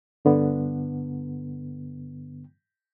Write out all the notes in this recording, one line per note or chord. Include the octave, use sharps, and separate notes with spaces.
G2 D3 B3